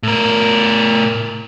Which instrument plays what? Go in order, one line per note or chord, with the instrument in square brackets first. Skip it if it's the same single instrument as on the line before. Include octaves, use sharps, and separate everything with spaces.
[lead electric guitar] A2 A#4